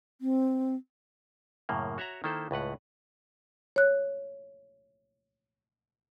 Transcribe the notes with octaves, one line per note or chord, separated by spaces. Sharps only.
C4
F#2 A2 C#3 A#3
F#4 C#5 E5 F#5 A#5
D#3 A#3 E4 A4 C5
C#2 A2 B4 F#5
C#5 F#6